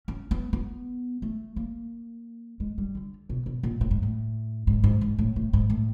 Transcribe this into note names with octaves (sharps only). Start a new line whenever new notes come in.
C#4
B3
B3
A3
A#3
G#3
G3
D3
B2
B2
A#2
A2
G#2
A2
G#2
G#2
G#2
A2
A2
G#2
A2